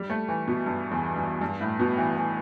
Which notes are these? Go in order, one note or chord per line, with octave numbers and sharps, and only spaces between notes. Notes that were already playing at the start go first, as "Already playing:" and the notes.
Already playing: G3
A3
E3
B2
G2
E2
G2
G2
A2
B2
E3
E3